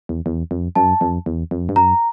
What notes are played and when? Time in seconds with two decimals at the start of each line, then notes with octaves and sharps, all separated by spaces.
0.09 E2
0.26 E2
0.51 F2
0.75 F#2 A5
1.01 F2
1.26 E2
1.51 F2
1.69 G2
1.76 F#2 A#5